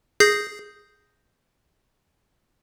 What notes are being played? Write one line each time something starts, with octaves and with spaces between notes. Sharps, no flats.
G#4 G6 A#6 C7